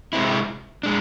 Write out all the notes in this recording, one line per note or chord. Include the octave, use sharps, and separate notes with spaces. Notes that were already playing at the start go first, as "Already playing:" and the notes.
C3 G#3 C4 E4
G#3 D4